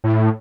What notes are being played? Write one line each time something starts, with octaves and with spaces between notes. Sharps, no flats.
A2